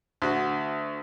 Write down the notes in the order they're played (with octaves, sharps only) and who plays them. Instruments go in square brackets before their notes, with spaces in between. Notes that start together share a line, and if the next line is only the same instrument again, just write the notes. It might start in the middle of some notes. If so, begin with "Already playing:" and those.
[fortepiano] D2 F#4